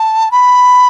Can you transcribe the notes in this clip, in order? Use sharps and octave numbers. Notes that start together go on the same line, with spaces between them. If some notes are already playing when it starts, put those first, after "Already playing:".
Already playing: A5
B5